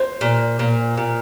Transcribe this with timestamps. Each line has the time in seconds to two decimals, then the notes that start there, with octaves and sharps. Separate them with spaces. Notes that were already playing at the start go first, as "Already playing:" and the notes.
Already playing: C5
0.21 A#2
0.59 A#2
0.97 A#2